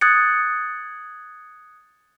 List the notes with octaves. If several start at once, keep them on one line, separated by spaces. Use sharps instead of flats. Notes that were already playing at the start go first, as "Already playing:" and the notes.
D#6 F#6 G#6 A6 C#7